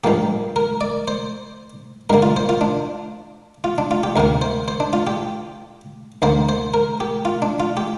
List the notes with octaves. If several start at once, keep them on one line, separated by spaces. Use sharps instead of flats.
G2 F3 A#3 G4
A#4
D5
C5
G2 D3 A#3 A#4
F4
C5
F4
D4
F4
D4
F4
G4
D2 C3 A#3 A#4
C5
C5
D4
F4
G4
D2 D3 A#3 C5
C5
A#4
G4
F4
D4
F4
G4